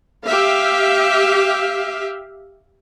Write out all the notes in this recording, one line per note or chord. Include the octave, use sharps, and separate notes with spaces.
G4 E5 F5